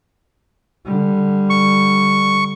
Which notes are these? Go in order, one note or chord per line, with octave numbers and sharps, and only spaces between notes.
D3 G3
C#6